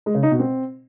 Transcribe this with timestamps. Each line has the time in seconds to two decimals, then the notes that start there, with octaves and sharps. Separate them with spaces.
0.06 G#3
0.15 C#3
0.23 D#4
0.31 B2
0.40 C4